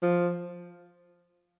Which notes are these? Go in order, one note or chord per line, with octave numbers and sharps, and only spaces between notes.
F3